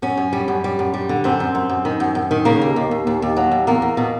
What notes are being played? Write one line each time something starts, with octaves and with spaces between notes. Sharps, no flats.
F#2 C#4
F#2
G3
F#2
G3
F#2
G3
D3
F#2 C4
F#2
F#2
F#2
D#3
F#2
F#2
D#3
C#3 A#3
D#2
D#2
D#2
D#2
D#2
F#3
D#2
E2 A#3
E2
B2